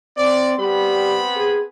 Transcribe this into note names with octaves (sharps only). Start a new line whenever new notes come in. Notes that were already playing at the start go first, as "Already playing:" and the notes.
C4 D5
G3 B3 C4 B5
G#4